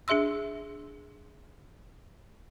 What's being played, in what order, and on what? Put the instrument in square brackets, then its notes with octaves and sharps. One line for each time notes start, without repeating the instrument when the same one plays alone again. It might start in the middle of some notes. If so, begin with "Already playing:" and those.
[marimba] D4 G#4 E5 C6 E6